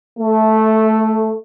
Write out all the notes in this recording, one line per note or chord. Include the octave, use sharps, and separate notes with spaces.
A3